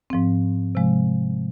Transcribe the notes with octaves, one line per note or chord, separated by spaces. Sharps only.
G#2 F3 C4
C3 F3 G#3